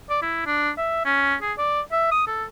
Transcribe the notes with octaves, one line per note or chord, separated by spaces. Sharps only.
D5
E4
D4
E5
C#4
G#4
D5
E5
D#6
A4